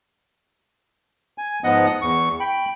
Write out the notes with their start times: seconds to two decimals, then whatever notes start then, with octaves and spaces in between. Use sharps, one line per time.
1.38 G#5
1.64 G#2 F3 B3 D#5 F#5 D#6
2.02 E2 C#6
2.40 G5 B5